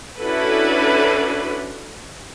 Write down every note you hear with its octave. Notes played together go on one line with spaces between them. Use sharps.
C#4 D4 E4 F#4 A4 B4